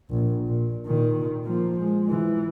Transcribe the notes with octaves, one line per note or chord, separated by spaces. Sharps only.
A#1
A#2
A#2 D#3
F3 A#3
G#3
E3